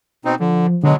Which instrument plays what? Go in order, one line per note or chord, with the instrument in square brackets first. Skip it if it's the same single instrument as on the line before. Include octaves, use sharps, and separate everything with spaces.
[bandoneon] B2 C4 D#4
[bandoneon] D3 [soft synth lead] F3
[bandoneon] B2 F#3 G#3 [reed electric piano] D3